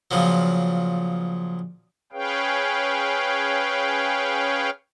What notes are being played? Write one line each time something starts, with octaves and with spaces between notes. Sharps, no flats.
A#2 C#3 F3 F#3
C#4 G#4 B4 C#5 F5 G5